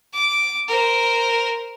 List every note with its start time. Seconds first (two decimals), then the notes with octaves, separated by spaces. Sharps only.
0.13 D6
0.68 A#4 C5